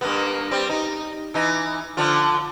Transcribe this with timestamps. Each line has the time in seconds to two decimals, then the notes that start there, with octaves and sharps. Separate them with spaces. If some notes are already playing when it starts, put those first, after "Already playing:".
0.01 G2 A#3 B3
0.51 G3 C4
0.69 D#4
1.34 E3 D#4
1.97 D3 F3 F4